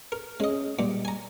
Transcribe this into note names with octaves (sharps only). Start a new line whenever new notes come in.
A#4
G#3 C#4 D#5
A#2 G3 G#3
G#5 A#5